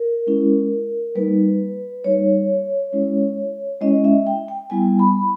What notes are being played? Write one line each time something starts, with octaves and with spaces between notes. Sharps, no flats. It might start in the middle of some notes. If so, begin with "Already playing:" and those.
Already playing: A#4
G#3 C#4 E4
G3 A#3 D#4 B4
G3 A#3 D#4 C#5
G#3 C#4 E4
G#3 C#4 E4 D#5
E5
G5
G5
G3 B3 E4 G#5
B5